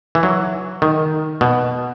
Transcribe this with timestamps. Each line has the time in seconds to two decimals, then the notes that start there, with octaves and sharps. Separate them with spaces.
0.15 E3
0.23 F#3
0.82 D#3
1.41 B2